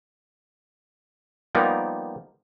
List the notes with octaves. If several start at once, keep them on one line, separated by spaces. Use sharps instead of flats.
F3 G3 A#3 B3 D#4 A#4